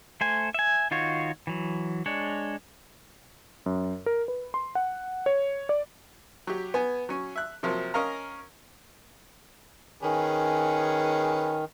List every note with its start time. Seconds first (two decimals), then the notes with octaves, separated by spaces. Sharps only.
0.21 A3 C5 G#5
0.54 E5 G#5
0.91 D#3 D#4 F4 F#4 C#5
1.47 E3 F#3
2.06 G#3 D4 C#5
3.66 F#2
4.06 A#4
4.28 B4
4.54 C6
4.75 F#5
5.26 C#5
5.69 D5
6.47 F#3 G4
6.74 B3 G#5
7.09 F#3 C#4
7.36 E5 F#6
7.63 C3 F3 F#3 A#3
7.94 C#4 A#4 D#5 F5 A#5
10.03 D#3 C#4 G#4 B4